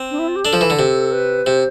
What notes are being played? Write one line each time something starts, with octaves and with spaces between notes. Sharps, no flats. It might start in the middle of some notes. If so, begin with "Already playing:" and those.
Already playing: C4
D4
E4
F4
G4
D4 A4
F3
E3
D3
C3
B4
C3 C5